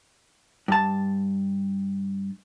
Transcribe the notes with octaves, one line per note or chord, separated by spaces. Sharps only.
G2 A5